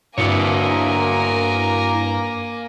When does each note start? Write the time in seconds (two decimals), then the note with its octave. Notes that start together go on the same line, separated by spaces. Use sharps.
0.18 G2 A#3 E4 F#4 A#4 C#5 G#5